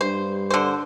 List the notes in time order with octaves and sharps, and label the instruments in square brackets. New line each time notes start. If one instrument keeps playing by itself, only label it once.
[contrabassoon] G2 [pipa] C5
[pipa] D3 C5